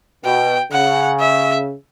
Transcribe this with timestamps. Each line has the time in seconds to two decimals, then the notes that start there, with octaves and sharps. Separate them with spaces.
0.24 B2 G5
0.72 C#3 F#5
1.20 E5